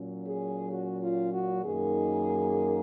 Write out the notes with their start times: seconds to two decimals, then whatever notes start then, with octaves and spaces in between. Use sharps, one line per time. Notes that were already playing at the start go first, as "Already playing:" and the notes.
Already playing: A#2 F#3 C#4
0.26 G#4
0.71 F#4
1.02 F4
1.32 F#4
1.63 F#2 D#3 A#3 D#4 G#4